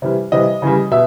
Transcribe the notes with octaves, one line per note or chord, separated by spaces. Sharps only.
C3 E3 G3
C3 E3 G3 D#5
C#3 E3 G3
B2 E5